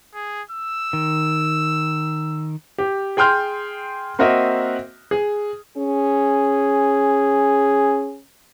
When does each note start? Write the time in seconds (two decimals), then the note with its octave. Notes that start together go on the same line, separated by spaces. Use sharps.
0.14 G#4
0.51 E6
0.93 D#3
2.78 G4
3.17 G#4 G5 C6 F6 G6
4.19 A#3 C4 F#4 A#4 D#5 E5
5.11 G#4
5.77 C#4 G#4